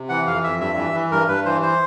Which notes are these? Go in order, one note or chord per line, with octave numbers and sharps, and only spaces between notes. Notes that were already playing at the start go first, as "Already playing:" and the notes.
Already playing: C3
E3 F#5
F2 F5
F2 E5
G2 E5
E3
E3
G2 A#4
G2 B4
E3 C5
C5